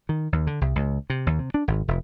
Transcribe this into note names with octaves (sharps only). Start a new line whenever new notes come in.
D#3
D#2
D3
C2
C#2
C3
D#2
C3
D4
G#1
F1